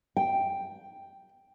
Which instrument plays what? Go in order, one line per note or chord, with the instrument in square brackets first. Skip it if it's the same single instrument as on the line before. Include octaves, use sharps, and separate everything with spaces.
[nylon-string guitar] G5